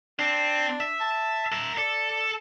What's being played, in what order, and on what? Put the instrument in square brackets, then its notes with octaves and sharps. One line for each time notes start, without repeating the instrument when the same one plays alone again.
[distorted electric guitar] C4 [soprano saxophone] D4
[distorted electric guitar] E5
[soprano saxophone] A5
[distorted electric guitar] A#4 E5
[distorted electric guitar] A4 [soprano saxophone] D5